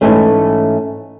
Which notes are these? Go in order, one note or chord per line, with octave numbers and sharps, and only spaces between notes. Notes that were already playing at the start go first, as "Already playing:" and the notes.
G#2 E3 A3 C#4